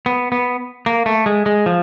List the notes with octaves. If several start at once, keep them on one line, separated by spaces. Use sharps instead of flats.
B3
B3
A#3
A3
G#3
G#3
F3